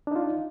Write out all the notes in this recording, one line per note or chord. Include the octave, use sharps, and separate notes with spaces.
D4 D#4 F4